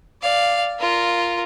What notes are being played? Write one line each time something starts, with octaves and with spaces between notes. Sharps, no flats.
D5 F5
F4 A#4